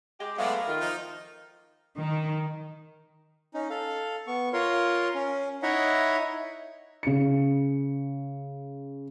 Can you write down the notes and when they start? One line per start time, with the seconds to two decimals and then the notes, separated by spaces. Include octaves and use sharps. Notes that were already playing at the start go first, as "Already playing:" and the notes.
0.20 G#3 G4 D#5
0.38 F#3 G#3 A3 B3 D5 F5 B5 D6
0.56 A#4
0.67 D#3 F4
0.81 F3 D#4 D#5
1.97 D#3
3.54 C#4 D#4
3.70 A4 F5
4.27 B3 C#6
4.53 F4 A#4 C#5 C6
5.15 C#4
5.63 D#4 E4 C#5 D#5 E5 F#5
7.03 C#3 C#7